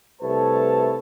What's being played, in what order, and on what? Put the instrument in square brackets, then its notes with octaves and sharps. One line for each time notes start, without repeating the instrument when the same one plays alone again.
[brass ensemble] C2 A3 A4 B4 C#5 A5